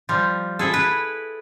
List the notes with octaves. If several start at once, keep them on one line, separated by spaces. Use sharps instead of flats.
F3 G3
E4 G#4 A4
B4